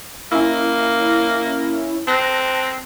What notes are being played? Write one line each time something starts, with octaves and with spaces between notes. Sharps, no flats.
A#3 C#4 E4
C4 A5 F#6 A#6